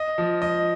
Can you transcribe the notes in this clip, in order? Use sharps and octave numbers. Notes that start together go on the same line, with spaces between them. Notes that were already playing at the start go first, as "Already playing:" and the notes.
Already playing: D#5
F3
D#5